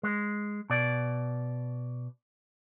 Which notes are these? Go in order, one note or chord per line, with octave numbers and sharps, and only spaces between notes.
G#3
B2 D5